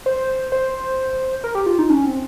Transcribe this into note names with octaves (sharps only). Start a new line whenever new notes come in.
C5
C5
A#4
G4
F4
D#4
C#4
C4